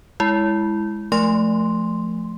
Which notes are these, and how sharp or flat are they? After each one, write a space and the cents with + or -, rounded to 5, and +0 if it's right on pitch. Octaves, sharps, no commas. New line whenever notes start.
G#3 +0 E4 +0
F3 +0 A3 -10 C6 +0